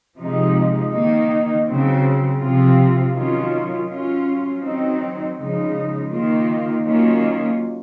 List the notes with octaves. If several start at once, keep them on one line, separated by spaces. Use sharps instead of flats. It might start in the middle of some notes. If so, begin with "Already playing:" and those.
C3 F3 G#3 D#4
D#3 A#3 D#4
C#3 F#3 C4
C3 F3 C4 F4
D#3 F#3 C#4 F4
F#3 C#4 F4
D#3 F#3 C4 D#4
C#3 F3 G#3 D#4
D#3 A#3 F4
D#3 F#3 A#3 C#4 F4